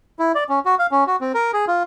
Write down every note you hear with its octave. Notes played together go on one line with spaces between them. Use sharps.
E4
D5
C#4
F#4
F5
C#4
F#4
C4
A#4
G#4
F4